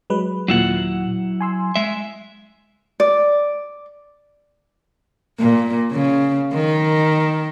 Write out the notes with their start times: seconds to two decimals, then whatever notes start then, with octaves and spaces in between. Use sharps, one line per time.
0.10 F#3 G#3 B4
0.48 D#2 A#2 F#3 E4 F#5
1.41 G#5 C6 E6
1.76 G#3 E5
3.00 D5
5.38 A#2
5.92 C#3
6.53 D#3